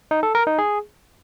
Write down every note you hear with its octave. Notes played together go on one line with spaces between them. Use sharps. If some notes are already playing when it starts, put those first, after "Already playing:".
D#4
A4
A#4
D#4
G#4